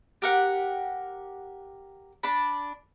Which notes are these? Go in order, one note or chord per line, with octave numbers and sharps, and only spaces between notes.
G4 A#4 F#5
D4 B5